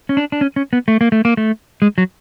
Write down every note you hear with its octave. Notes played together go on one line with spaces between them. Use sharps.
C#4
D4
D4
C#4
C#4
B3
A3
A#3
A3
A#3
A3
G#3
F#3